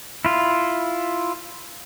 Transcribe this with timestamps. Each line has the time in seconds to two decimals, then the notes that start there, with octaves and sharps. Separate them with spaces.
0.25 E4 F4